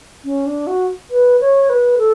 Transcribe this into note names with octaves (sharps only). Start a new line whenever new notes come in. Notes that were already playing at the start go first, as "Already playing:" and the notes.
C#4
D4
F#4
B4
C#5
B4
A4